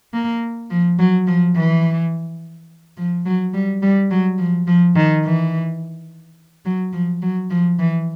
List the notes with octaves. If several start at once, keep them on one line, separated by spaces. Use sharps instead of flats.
A#3
F3
F#3
F3
E3
F3
F#3
G3
G3
F#3
F3
F3
D#3
E3
F#3
F3
F#3
F3
E3